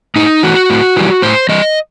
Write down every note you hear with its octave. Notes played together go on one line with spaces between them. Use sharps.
A2 D#4
E3 A3 F#4
A2
E3 G3
A2 C5
E3 G3 D#5